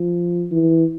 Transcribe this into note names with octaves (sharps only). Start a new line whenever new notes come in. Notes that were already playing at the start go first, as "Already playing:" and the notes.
Already playing: F3
E3